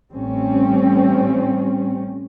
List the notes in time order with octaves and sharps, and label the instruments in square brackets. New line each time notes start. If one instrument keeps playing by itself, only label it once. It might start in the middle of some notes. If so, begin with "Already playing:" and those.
[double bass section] A1 G3 C4 C#4